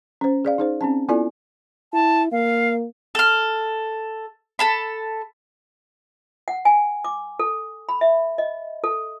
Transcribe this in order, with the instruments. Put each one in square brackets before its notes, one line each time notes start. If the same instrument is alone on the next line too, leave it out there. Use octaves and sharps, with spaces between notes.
[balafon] C#4 C5
G#4 D5 F5
D#4 G#4 C5
C4 C#4 A5
B3 E4 F4 A4 D5 G#5
[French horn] E4 [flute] A5
[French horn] A#3 [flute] F5
[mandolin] A4 F6
A4 A5 B5
[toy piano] F#5
G#5
D6
A4
B5
E5
D#5
A4